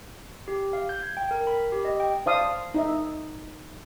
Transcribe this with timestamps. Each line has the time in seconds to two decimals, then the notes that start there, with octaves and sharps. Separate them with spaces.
0.48 G4
0.73 F5
0.89 G6
1.02 G#6
1.17 G5
1.31 A#4
1.47 B5
1.72 G4
1.85 D#5
2.00 G5
2.26 C5 D5 F5 A5 D#6
2.74 D#4 D#5 E5